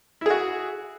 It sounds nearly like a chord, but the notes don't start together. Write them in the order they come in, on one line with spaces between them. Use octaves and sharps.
E4 G#4 F#4